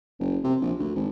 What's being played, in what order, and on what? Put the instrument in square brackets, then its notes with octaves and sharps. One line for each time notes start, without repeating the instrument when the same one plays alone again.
[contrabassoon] F#1
C3
A#1
D2
G#1